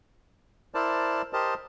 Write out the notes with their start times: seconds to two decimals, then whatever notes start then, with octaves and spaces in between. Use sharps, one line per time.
0.75 E4 A#4 C5 D5 A5
1.33 G4 A#4 C5 D#5 A5